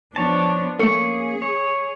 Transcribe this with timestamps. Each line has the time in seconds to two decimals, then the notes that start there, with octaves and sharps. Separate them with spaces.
0.16 F3 B3 D4 C#5 A5
0.79 A3 A#3 C#4 G#4 A4 C#6
1.42 C#5